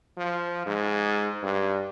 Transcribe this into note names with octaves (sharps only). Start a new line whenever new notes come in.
F3
G#2
G2